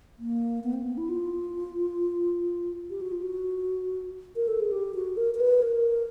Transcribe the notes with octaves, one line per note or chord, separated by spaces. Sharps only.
A#3
B3
C4
B3
E4
F4
G4
F#4
F4
F#4
A#4
A4
G#4
G4
F#4
A#4
A#4
B4
A#4